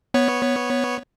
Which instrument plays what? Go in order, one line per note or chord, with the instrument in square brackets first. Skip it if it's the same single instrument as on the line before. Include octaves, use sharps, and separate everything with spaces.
[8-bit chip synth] B3 C#5